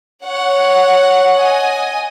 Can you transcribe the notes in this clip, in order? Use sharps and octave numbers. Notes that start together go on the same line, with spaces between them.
C#5 F#5
D#5 G#5